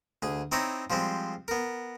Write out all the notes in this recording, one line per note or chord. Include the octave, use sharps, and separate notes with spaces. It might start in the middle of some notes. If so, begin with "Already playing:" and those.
D2 G#4
C4 D#4 E4 C#5 D5 A#5
F3 G3 G#3 C4
B3 A#4